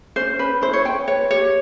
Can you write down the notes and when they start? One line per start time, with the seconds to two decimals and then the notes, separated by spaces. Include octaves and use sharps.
0.16 C#4 C5
0.39 C#4 B4
0.62 E4 C5
0.73 C#5
0.85 B4 G5
1.08 B4 C#5
1.31 G4 C#5